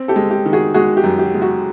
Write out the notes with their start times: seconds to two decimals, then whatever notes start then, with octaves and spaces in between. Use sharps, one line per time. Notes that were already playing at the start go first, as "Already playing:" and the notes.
Already playing: C4
0.08 G4 A4
0.16 G#3
0.31 G4
0.46 D#3
0.53 F#4 G#4
0.74 G#3 F#4 G#4
0.97 G4
1.04 F#2
1.19 G4
1.34 G#3
1.42 F#4